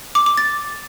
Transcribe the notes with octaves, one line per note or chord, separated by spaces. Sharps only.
D6
D6
A6